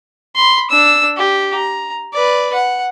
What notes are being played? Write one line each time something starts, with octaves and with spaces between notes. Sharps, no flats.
B5 C6
D4 E6
G4
A#5
B4 D5
F#5